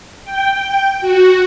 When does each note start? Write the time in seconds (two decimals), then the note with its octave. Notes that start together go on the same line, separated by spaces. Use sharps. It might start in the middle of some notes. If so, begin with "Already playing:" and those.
0.24 G5
1.01 F#4